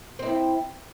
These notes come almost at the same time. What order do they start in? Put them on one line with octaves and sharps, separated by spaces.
C4 D#4 E4